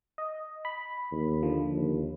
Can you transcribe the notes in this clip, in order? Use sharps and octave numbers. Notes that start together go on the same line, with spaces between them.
D#5
B5
D#2
D3 F3
D#2